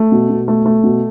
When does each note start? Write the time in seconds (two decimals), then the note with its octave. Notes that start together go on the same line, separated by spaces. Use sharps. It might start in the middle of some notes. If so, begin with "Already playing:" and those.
Already playing: A3
0.12 B2
0.30 B2
0.48 A3
0.66 A3
0.84 B2